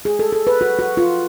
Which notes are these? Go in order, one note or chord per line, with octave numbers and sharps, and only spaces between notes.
G#4
A4
A4
B4
F#4
F#4
F4